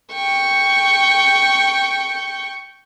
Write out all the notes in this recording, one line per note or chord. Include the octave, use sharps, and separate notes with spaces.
G5 C#6